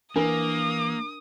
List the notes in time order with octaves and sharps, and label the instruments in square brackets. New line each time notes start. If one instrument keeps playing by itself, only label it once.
[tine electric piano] E3 [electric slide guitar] A#3 [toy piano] D4 A#4 [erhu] D#6